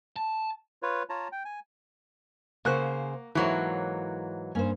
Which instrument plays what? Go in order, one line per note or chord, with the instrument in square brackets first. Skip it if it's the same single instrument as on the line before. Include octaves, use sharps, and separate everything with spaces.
[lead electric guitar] A5
[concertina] F4 B4 C#5
F4 C#5 A5 A#5
G5
G#5
[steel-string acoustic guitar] C#3 C5 [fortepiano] A#3 C#6 F#6 [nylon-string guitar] F#5
[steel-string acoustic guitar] G#2 [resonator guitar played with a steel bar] E3 F#3 A#3 [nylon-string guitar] A4 C#5 [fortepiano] C#6
[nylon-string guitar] G2 A#3 [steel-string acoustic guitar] C#4 C5